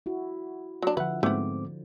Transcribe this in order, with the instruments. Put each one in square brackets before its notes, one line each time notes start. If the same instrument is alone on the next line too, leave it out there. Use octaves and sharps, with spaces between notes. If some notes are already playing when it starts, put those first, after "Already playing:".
[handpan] E4 F#4
[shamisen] F#3 D4
[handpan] D3 F3 [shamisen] B4 [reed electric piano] E5 F#5
[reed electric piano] G#2 C4 D6 [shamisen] A3 B3